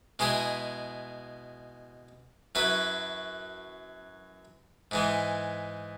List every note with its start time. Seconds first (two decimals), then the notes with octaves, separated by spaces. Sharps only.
0.19 B2 G#3 E4 G#4
2.55 F#2 F#3 E4 B4
4.91 G#2 E3 G#3